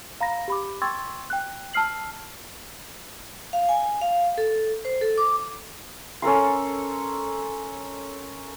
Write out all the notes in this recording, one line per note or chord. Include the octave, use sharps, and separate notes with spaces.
F5 A#5 B5 A#6
G4 B5 D6
G5 C6 C#6 E6 G#6 A6
G5 F#6
A5 E6 F6 C7 F#7
F5
G#5
F5
A4
C5
A4
D6
C#4 A4 A#4 C6